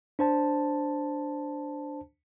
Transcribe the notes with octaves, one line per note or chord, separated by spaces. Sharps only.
D4 C5 A5